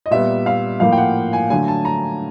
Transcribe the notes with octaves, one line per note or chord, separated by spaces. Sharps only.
D#5
A#2 G3 B3 E5
F5
A2 F3 A#3 F5
G5
F#5
G#5
D3 F#3 A3 G#5
A5
A#5